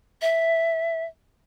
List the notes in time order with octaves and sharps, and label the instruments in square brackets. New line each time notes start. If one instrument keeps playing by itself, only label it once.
[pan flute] E5